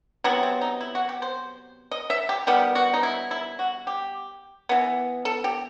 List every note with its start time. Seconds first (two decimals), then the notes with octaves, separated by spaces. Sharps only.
0.24 C3 F#3 B3 E4
0.43 C4
0.61 D#4
0.81 E4
0.95 F#4
1.09 G4
1.22 C5
1.91 D#5
2.10 E5
2.29 G4
2.47 D#3 G3 B3 G4
2.75 F#4
2.94 D#4
3.03 E4
3.31 E4
3.59 F#4
3.87 G4
4.69 E3 B3
5.25 A4
5.44 G4